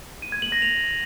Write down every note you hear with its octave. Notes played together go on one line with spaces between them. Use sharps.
D#7
G#6
F#7
A#6
F7